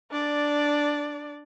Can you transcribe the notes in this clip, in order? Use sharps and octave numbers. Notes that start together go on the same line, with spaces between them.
D4 D5